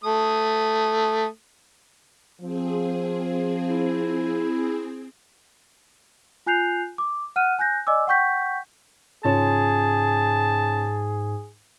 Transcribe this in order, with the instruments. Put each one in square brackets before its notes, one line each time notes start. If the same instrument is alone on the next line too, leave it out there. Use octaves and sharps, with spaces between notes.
[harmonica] A3 D#6
[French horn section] F3 [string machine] C4 G#4
[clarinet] E4
[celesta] F4 G#5 F#6 G6 C7 F7
D6
F#5 F6 F#6 D#7
G#5 F#6 G6 A#6
D5 D#5 G#5 D6 E6
F#5 G5 C#6 G6 B6
[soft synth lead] G#2 [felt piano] C#3 F4 C#5 [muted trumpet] G#4 [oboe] A5